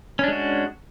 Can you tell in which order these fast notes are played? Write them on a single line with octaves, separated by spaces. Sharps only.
C#4 D4 G#3 F#4